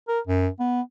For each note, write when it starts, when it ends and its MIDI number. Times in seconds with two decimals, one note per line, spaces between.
0.08 0.20 70
0.27 0.48 42
0.60 0.81 59